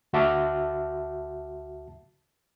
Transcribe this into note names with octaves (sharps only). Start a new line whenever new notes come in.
D2 F#4 E5 A5 D6 F6